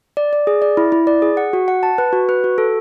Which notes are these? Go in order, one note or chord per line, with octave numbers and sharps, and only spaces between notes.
D5
D5
G#4
D5
E4
E4
D5
G#4
F#5
F#4
F#5
A5
B4
F#4
B4
F#4
A4